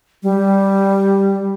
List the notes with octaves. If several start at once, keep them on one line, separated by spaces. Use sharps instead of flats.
G3